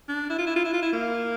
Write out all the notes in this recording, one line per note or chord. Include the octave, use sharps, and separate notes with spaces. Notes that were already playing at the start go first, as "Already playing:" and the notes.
D4
E4
F4
E4
F4
E4
F4
E4
A#3